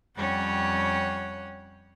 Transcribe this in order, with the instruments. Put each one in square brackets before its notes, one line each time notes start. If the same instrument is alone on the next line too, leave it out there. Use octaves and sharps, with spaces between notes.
[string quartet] F2 G3 C#4 C#5 F#5 G5